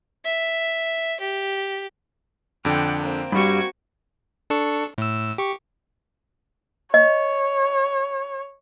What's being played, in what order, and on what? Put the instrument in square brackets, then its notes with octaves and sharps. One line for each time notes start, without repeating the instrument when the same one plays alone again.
[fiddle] E5
G4
[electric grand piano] F2 D3 [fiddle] F#5 G5
[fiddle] A#3 C4
[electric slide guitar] G2 G3 [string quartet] F#4 C#6 G#6 [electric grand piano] B5
[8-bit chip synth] D4 A4 C#6
A2 E6
G4 C#6
[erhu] C#5 [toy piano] D#5